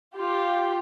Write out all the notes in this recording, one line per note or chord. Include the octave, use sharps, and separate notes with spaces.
F4 G4